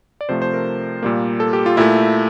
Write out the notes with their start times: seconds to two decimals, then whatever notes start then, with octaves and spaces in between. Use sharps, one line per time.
0.21 D5
0.29 C3 F3 A3 C5
0.42 C5
0.53 A#4
1.03 A#2 G3 A#3
1.40 A4
1.53 G4
1.66 F4
1.77 A#2 A3 E4